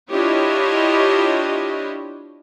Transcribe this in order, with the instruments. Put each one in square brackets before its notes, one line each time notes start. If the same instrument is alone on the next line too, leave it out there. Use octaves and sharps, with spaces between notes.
[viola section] D4 E4 F4 G4 C#5 D#5